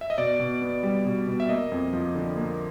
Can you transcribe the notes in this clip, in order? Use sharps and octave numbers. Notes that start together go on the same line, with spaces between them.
E5
D#5
B2 D5
B2
B3
G3
B2
B2
E5
A#3 D#5
F2
F3
D3
A#3